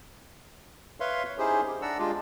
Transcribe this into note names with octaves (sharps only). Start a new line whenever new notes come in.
B4 C#5 E5 F5 C6
C#5
C#4 D#4 E4 G4 G#4 C5
G4
D4 D5 F#5 A#5 E6
G#3 D4 F4 G4